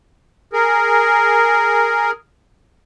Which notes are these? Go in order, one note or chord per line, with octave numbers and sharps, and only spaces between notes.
G#4 A#4